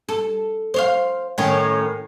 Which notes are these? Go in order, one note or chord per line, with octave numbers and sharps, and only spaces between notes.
A4
C5 C#5 F5
A2 D#3 C#4